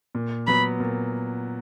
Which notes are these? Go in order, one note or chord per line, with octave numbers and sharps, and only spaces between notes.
A#2
F#3 B3 B5
A#2